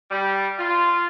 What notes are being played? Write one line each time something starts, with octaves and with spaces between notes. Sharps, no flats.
G3
F4